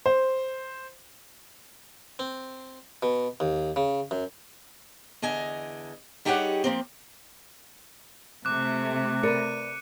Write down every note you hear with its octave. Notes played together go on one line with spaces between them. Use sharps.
C5
C4
B2
D#2
C#3
F#2
E2 D3 D#5 G#5
G3 D#4 G4 G#4 C#5 F#5
F3 A#3 C4
C3 A3 D6 F#6
A#4 B4 D5 C#7 D#7